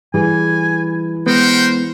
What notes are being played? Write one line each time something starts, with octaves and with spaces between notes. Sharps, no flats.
E3 G3 G#4 G#5
G#3 B3 A#4 C5 F#5 G5